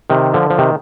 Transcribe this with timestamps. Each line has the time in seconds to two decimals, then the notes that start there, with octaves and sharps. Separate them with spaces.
0.10 C3 D#3
0.34 D3 F3
0.50 F3
0.58 C3 D#3